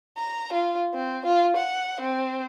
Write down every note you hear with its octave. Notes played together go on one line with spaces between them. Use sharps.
A#5
F4
C4
F4
F#5
C4